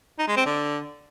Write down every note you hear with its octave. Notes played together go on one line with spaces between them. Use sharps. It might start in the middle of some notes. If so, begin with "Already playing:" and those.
D#4
G#3
C4
D3